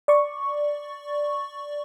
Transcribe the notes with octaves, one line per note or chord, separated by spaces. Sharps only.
D5 C#6